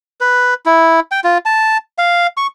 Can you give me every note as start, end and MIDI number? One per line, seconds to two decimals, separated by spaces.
0.21 0.54 71
0.66 1.00 64
1.11 1.20 79
1.24 1.38 65
1.45 1.77 81
1.98 2.27 77
2.37 2.47 85